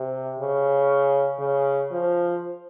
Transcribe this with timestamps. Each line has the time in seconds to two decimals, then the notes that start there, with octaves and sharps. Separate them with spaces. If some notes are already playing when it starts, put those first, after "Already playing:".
Already playing: C3
0.39 C#3
1.39 C#3
1.91 F3